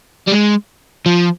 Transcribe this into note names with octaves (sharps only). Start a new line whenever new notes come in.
G3
G#3
F3